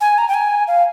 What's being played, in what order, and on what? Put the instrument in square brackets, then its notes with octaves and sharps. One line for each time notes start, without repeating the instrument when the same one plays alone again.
[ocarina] G#5
A#5
G5
G#5
F5